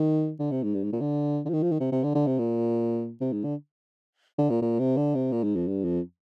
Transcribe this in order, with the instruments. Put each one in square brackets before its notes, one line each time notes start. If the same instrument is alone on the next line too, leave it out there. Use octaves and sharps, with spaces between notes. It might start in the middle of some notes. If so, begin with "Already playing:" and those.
Already playing: [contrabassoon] D#3
D3
C3
G#2
G2
G#2
A#2
D3
D3
F3
D#3
F3
D#3
C3
C3
D3
D3
C3
A#2
C3
G#2
D3
D3
A#2
A#2
C3
D3
C3
A#2
G#2
F2
G2
F2